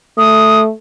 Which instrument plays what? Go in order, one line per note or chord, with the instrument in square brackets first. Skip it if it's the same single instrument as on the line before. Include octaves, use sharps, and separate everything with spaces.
[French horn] A3 [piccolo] D#6